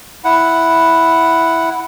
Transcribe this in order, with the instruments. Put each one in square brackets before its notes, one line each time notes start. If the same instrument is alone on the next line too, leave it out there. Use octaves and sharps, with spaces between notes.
[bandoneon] E4 F#5